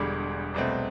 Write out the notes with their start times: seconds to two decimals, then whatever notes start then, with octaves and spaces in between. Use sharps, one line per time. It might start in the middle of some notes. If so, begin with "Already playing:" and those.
Already playing: E1 E2 D3 G3 C6
0.54 C2 B2 A3 C4